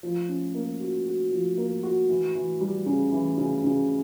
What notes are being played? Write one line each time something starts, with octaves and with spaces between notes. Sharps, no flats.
F3
C#4
A#3
F#4
F#4
F3
A#3
F#4
E3
E3
G3
C#3
E3
C#3
C#3